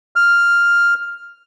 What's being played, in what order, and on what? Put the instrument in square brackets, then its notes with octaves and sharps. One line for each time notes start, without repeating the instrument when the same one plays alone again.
[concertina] F6